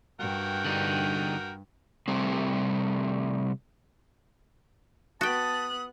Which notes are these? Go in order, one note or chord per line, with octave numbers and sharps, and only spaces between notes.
G2 F#4 A#4 G5
D3 G3 D#4
C3 G3 A3 C4
B3 F#4 G5 A5 D#6 F#6